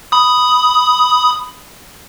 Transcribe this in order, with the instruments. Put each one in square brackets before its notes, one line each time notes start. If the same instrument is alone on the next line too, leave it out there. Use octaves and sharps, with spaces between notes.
[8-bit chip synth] B5 D#6